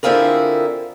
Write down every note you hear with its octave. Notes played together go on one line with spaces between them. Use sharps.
D3 C4 E4 F4 G#4 A#4